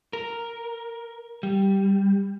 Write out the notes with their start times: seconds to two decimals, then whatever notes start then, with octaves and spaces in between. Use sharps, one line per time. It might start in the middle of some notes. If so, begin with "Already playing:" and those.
0.13 A#4
1.43 G3